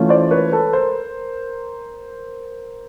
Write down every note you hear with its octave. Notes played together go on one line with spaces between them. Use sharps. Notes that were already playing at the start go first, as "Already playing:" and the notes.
Already playing: E3 A3 C#4 F4
C5 D5
B4 C#5
A4 B4
A#4 C5